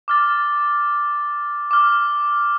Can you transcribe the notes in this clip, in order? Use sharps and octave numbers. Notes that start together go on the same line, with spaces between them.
D6 F6 A6
D6 F6